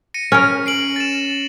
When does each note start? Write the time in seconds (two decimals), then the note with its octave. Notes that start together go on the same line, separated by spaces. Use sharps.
0.14 A#6 C#7 D#7
0.32 C#4 A#4
0.66 C7 D7 F#7
0.96 A6 E7